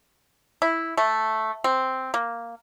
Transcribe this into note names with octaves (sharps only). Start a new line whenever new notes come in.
E4
A3
C4
A#3